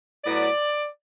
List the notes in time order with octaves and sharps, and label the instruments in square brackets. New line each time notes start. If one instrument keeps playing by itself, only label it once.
[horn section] A2 F#3 B3 D5